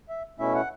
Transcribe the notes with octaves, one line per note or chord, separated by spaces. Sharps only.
E5
B2 A3 C#4 E4 E5
F#5